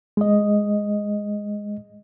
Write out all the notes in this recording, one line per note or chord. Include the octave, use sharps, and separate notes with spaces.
G#3 D#5